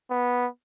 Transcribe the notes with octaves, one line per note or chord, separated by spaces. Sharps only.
B3